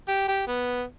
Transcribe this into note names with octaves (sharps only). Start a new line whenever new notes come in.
G4
G4
B3